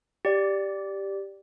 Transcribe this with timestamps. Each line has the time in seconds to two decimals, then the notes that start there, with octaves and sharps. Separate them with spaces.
0.25 G4 D5